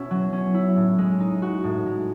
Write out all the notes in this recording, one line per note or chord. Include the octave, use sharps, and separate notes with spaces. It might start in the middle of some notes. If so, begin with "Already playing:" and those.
Already playing: B2 C#4 E4
F#3
C#4
E4
A2
G#3
D#4
F#4
A2
G#3